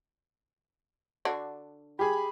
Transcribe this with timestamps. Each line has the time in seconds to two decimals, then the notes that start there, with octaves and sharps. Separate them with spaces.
1.25 D3 D4 F#4
1.99 G4 G#4 B5